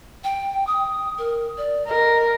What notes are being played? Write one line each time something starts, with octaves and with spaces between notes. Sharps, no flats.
G5
D#6
A#4
D5
A#4 D#5